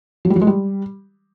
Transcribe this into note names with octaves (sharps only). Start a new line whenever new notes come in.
F#3
G3
F#3
G#3
G3